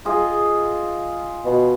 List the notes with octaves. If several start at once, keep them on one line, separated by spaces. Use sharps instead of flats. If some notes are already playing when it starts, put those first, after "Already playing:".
F4 G#4 D#5
B2